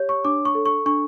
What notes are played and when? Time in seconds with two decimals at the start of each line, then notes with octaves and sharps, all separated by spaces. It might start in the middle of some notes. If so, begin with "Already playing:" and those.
Already playing: G4 C#5
0.09 C#6
0.25 D4 D6
0.45 C#6
0.55 A4
0.66 C#6
0.86 D4 C#6